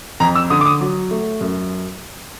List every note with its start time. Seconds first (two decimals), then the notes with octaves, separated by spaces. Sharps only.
0.20 F2 A#5
0.35 E6
0.50 D3 D#6
0.61 D6
0.66 D#6
0.80 F#3
1.11 A3
1.41 F#2